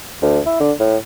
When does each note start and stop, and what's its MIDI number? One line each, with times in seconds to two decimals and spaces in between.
0.22 0.39 38
0.46 0.60 64
0.60 0.72 50
0.80 0.97 45